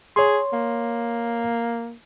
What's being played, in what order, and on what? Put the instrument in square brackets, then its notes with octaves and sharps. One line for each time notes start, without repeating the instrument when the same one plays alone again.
[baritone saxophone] G#4 [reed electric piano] C#5 C6
[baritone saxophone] A#3